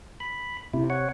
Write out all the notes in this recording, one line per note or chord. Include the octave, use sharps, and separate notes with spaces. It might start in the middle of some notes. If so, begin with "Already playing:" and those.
B5
C3 E4
C#5 F#5